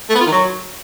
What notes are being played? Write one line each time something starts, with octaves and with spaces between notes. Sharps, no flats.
A3
B3
F4
D#3
F#3